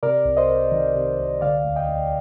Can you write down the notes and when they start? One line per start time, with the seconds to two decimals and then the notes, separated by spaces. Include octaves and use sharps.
0.03 C3 A#4 D5
0.25 C2
0.37 C5 D#5
0.49 C2
0.72 D#3
0.95 C3
1.19 C2
1.41 D3 D5 F5
1.64 D2
1.76 D#5 G5
1.88 D2